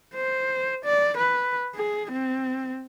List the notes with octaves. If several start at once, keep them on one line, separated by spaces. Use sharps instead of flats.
C5
D5
B4
G#4
C4